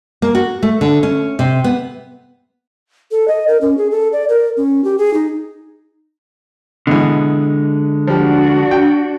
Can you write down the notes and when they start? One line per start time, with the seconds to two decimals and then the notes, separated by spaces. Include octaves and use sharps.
0.22 A#3
0.35 F#4
0.63 A3
0.81 D3
1.03 C#4
1.39 C3
1.64 B3
3.11 A4
3.28 D#5
3.48 A#4
3.61 C#4
3.78 G#4
3.91 A4
4.13 D5
4.29 A#4
4.57 C#4
4.84 G4
4.98 G#4
5.14 D#4
6.87 B2 D3 E3 G#3
8.07 F3 G3 D4 F#4
8.71 G5